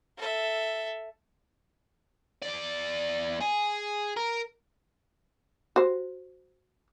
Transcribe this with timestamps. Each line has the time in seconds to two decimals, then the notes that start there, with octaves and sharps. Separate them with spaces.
0.18 A4 E5
2.42 E2 D5
3.41 G#4
4.17 A#4
5.76 F#4 C5